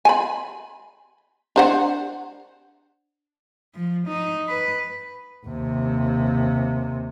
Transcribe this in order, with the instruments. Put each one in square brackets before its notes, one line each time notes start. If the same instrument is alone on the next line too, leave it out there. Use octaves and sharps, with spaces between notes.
[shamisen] G#5 B5
D4 C5 F#5
[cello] F3
D#4
B4
[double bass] D#2 C3